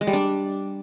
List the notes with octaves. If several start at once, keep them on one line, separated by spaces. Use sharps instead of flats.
G#3
G3
D4